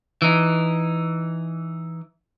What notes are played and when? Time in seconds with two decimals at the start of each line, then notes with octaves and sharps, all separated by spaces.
0.22 E3 D#4